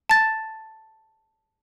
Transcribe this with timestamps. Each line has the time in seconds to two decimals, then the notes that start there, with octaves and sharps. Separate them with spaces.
0.10 A5 A6